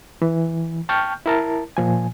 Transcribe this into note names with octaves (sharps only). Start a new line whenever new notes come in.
E3
G5 A5 C#6 F6 G6
E4 A#4 A5
A#2 F3 G#5